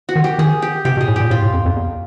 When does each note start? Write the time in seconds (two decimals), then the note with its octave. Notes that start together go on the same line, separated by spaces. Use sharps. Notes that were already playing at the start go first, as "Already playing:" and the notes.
0.09 F#4
0.16 D#3
0.24 G4
0.38 D#3 G#4
0.62 G4
0.85 C3 G4
0.97 B2
1.01 G#4
1.08 A2
1.16 A#2 G4
1.30 A2 F4
1.42 A2
1.53 F2
1.65 F2
1.76 E2